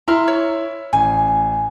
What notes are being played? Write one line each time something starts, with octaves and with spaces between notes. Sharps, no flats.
E4 A#5 C6 F6
C#5
A1 G#5